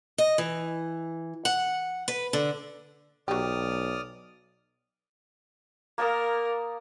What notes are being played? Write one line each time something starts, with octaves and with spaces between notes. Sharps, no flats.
D#5
E3
F#5
B4
D3
B1 F#3 G4 D5 D#6 F6
A#3 A#4 A5 D#6